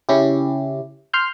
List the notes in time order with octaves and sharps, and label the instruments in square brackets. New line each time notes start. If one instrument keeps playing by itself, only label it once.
[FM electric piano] C#3 C#4 E4 G4
C6 F6 G6